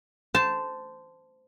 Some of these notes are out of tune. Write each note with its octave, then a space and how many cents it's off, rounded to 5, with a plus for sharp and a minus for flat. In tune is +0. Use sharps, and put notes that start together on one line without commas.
C5 -15 A5 +0